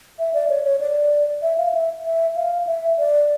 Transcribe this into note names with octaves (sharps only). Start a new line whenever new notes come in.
E5
D5
C#5
C#5
D5
E5
F5
E5
E5
F5
E5
D5